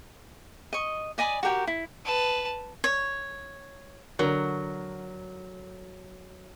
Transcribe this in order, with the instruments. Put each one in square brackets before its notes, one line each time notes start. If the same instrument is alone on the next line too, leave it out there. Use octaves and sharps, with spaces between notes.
[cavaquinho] D#5 C#6
D5 D#5 G#5 B5
F#4 G4 A#4 G5
E4
[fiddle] B4 A5
[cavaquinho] C#5
[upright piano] D3 A#4 [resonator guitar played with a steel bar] F#3